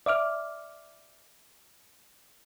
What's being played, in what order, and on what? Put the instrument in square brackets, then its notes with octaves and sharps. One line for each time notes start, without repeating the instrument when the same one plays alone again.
[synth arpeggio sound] D5 E5 D6 F6